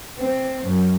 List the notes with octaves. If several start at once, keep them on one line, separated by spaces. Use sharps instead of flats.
C4
F#2